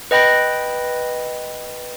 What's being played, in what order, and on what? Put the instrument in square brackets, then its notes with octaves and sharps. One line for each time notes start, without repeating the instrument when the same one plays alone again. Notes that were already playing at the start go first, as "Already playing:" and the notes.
[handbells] B4 D#5 G5 B5 A#6